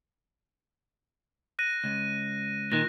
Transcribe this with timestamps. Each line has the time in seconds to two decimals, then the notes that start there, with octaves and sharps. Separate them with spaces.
1.59 F#6 A#6 D#7
1.84 C#2
2.72 A#2 D#3 F#6 A#6